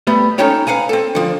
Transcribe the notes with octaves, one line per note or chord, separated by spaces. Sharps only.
G3 A3 B3
C#4 D#4 A4 C#5 G5
B4 F5 F#5 G#5 A#5
C4 A4
D3 F3